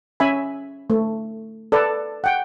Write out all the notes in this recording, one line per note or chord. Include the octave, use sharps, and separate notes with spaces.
C#4 E5 G#5 B5
A3
A4 B4 D5
F#5 G5